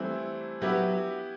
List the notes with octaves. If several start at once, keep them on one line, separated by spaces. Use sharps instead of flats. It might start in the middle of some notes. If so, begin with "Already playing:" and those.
Already playing: E3 G3 A3 C4 E4
F#3 B3 E4 G4 B4